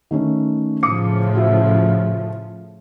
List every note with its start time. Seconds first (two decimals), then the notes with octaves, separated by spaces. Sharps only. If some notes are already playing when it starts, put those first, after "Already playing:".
0.11 D#3 A3 C#4
0.83 A2 C#3 F3 D6 D#6 C#7
1.35 F#4 E5